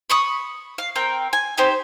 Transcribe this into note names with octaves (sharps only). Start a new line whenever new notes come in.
B5 C#6 D#6
F5
C4 A#4 G5
G#5
D#4 G4 C5